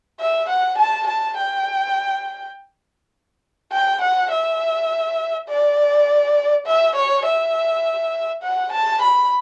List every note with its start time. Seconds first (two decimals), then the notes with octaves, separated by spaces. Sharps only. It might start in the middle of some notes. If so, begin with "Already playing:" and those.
0.20 E5
0.50 F#5
0.78 A5
1.07 A5
1.37 G5
3.72 G5
4.02 F#5
4.31 E5
5.49 D5
6.67 E5
6.96 C#5
7.25 E5
8.43 F#5
8.72 A5
9.02 B5